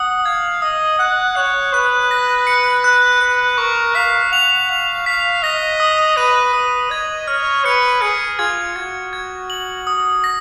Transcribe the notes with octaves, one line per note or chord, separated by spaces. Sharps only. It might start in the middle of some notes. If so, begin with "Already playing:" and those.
Already playing: F#5 D#6
F5 G#6
D#5 D#6
F#5 F#6
C#5 F#6
B4 F#6
A#6
C#7
F#6
B4 F#6
A#4 C#6
F5 B6
F#5 F7
F5 F7
F5 B6
D#5 A#6
D#6
B4 D#7
B4 D#6
D#5 G#6
C#5 F6
B4 C#7
G#4 C#7
F4 G#6
F#4 G#6
G#6
F#7
D#6
A#6